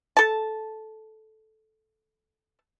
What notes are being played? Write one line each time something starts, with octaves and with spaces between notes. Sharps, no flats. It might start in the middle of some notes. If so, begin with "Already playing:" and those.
A4 A5